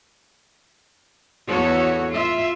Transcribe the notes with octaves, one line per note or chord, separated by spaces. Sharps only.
E2 B3 F#4 A4 C#5
F4 E5